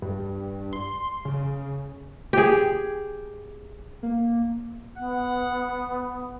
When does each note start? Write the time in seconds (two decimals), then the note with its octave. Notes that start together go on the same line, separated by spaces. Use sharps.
0.02 G2
0.73 C6
1.25 C#3
2.33 G4 G#4
4.03 A#3
4.98 B3 F#5